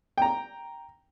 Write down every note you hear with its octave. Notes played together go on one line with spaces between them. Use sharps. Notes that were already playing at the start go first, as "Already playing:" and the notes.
G5 A#5